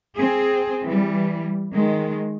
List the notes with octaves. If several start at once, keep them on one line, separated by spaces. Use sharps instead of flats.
C4 G#4
E3 G3
D#3 G#3